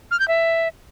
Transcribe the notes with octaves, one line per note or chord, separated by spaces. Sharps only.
F6
G6
E5